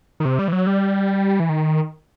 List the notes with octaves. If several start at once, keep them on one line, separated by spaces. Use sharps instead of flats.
D#3
C3
G3
E3
F#3
G3
E3
D#3